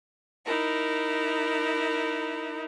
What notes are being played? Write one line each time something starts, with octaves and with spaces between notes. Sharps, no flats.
D#4 E4 A#4